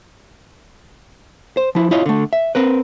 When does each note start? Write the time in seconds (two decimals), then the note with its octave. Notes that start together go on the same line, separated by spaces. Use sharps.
1.57 C5
1.75 F3 E4
1.91 E4 F4 C#5 D#5
2.06 D3 A3
2.33 E5
2.55 C4 A#4 B4